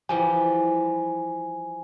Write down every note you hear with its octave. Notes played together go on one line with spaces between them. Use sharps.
E3 F3 G3 G#5